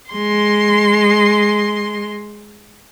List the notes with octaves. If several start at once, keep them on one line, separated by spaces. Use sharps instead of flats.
G#3 C6